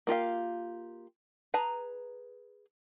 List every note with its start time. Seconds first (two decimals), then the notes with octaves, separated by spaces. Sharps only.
0.07 A#3 F4 G4 F5
1.54 G#4 B4 A5 A#5